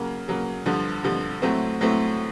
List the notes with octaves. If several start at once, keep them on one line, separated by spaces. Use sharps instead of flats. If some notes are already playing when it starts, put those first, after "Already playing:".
Already playing: C#3 F#3 A#3
C#3 F#3 A#3
G2 D3 F3
G2 D3 F3
A2 F#3 A3 C4
A2 F#3 A3 C4